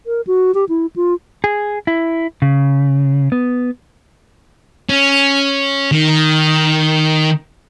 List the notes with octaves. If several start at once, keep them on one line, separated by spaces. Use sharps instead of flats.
A#4
F#4
G4
E4
F4
G#4
E4
C#3
B3
C#4
D#3